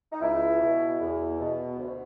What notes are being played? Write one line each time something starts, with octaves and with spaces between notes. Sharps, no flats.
D#4
C#2 E4
B2
E2
B2
D2